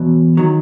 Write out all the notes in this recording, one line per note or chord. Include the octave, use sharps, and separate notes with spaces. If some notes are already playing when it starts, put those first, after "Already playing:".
Already playing: E2 B2 F#3
D#3 F#3